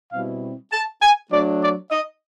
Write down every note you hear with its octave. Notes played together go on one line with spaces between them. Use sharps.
B2 G3 C4 E4 F5
A5
G#5
F#3 A3 D4 D5
D5
D#5